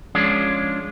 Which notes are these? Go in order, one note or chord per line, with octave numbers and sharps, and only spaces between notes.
F3 G#3 C#4 D4 F4 D5